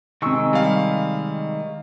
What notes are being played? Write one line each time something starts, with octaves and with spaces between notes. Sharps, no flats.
C3 D#3 G#3 C#6 E6
G3 F5